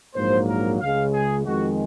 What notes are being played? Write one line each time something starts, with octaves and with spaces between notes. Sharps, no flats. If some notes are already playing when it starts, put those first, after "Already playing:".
A#1 G#2 F#3 A#3 C5
A#4
C#2 C#3 G#3 F5
G#4
F2 D#3 G#3 F#4